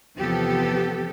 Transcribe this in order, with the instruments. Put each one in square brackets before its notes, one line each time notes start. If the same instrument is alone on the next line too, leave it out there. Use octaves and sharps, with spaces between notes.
[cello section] E2 C3 F3 B3 G4 A4